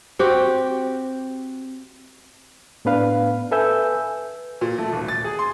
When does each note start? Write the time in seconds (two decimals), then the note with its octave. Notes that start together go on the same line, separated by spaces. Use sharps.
0.19 C4 F#4 G4
2.85 A2 B3 D4 B4 F5
3.51 A4 B4 E5 G#5 E6 G6
4.61 A#2
4.78 A3
4.93 D#1
5.08 A6
5.24 G#4
5.39 C6